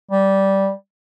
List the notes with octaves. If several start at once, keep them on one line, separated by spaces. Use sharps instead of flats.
G3